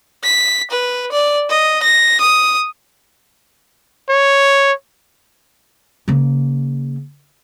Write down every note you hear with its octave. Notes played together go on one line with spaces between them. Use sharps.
B6
B4
D5
D#5
A#6
D#6
C#5
C#3 A#3